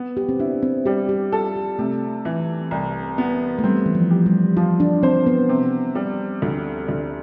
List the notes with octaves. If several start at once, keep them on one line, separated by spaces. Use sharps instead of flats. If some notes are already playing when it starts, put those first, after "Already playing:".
Already playing: B3
G4
C4
D4 E4
C4
G3 G4
G4
F4 A4
G4
C3 A3
E3
C2
B3
A3
G3 C4
E3
F3
G4
G3
F3 F4
D4
C4 C5
B3
C3
G3
D2
D2